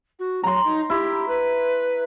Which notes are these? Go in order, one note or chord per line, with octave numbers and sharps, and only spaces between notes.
F#4
F#3 A#5 C6
D#4
E4 G4
B4